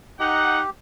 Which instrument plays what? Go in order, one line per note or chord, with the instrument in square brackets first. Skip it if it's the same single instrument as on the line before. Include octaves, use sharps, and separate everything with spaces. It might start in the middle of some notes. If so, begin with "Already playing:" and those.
[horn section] D#4 F#5 [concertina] G4